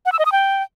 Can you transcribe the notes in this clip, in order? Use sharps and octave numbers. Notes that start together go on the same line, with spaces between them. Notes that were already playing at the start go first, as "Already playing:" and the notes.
F#5
E6
D#5
D#6
G5